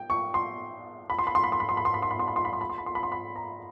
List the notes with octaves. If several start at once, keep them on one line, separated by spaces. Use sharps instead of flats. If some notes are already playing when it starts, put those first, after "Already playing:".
Already playing: G5
C#6
C6
B5
C6
B5
C6
B5
C6
B5
C6
B5
C6
B5
C6
B5
C6
B5
C6
B5
C6
B5
C6
B5
C6
B5
C6
B5
A#5